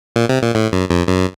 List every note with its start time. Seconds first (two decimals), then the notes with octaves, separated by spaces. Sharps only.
0.16 A#2
0.29 C3
0.43 A#2
0.55 A2
0.72 F#2
0.90 F2
1.08 F#2